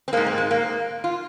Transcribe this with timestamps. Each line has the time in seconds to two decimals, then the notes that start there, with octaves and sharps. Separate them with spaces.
0.08 C4
0.13 G#2 G#3 A#3
0.26 C4
0.38 G#3
0.51 A#3
1.04 F4